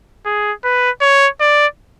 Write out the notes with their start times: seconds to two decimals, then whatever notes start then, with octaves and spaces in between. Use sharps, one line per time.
0.26 G#4
0.64 B4
1.02 C#5
1.40 D5